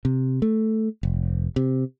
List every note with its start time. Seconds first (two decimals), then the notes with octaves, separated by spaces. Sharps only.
0.05 C3
0.42 A3
1.03 F1
1.56 C3